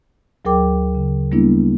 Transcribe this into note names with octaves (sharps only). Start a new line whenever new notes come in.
D2 F#3 G#4 A#4 G5 D6
C#3
G3 A#3 B3 D4 E4